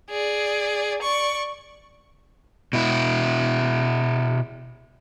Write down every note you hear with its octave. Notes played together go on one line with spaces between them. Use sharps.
G#4 D5
D5 C#6
B2 E4